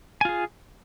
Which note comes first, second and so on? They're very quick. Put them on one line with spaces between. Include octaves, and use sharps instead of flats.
G#5 F4 G#4